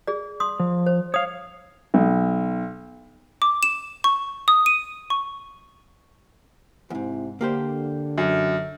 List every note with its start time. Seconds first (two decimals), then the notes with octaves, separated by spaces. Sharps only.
0.07 G#4 D5
0.40 C6 D#6
0.60 F3
0.86 C5
1.14 C#5 F5 D#6
1.94 B1
3.42 D6
3.63 E7
4.04 C#6
4.48 D#6
4.66 D#7
5.10 C#6
6.90 E2 G#2 C3 C4 E4
7.41 D3 A#3 G4 C5
8.18 F#2